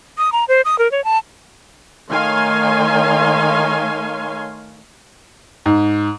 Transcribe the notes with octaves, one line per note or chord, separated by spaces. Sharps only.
D#6
A#5
C5
D#6
A#4
C#5
A5
D#3 A3 C#5 F5 G#5 C6
G#2